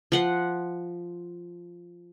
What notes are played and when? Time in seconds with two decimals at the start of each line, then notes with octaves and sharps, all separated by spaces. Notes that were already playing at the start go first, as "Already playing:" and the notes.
0.12 F3 F#5 C6